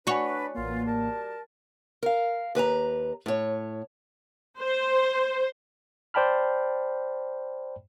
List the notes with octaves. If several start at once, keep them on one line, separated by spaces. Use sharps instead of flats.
D4 F#4 B4 C#5 D5 F#5 G#5
A1 A#2 E3 A#3 F4
G3 A#4 A5
A#4 F5
D#2 B4 G#5 A#5
A2 C#5
C5
C5 D5 G5 A5 B5 F6